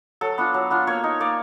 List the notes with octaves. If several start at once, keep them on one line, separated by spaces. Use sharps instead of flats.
F#3 A4
B3 D4 F4
F#3
B3 D4 F4
A#3 C#5
D#4
A#3 D5